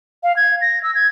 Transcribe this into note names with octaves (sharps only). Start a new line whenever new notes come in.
F5
G#6
A#6
E6
G#6